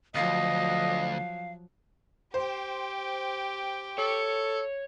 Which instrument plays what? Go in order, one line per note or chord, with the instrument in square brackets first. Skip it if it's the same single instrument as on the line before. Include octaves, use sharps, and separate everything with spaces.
[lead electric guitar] D2 [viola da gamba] F3 F#3 [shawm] D#5 [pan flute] F5
[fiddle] G4 G5 [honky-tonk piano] C5
[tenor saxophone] A4 [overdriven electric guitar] C#5